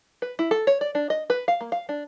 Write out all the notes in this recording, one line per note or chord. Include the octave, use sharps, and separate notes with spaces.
B4
E4
A4
C#5
D5
D4
D#5
B4
F5
A#3
F5
D4